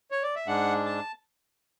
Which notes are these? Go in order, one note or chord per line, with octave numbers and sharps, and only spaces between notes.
C#5
D5
E5
G#2 G#3 D4 F#5
A5